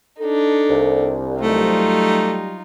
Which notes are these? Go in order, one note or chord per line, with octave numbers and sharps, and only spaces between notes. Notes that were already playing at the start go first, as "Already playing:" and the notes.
D4 D#4 A4
C2
F#3 G3 A3 D#4 F4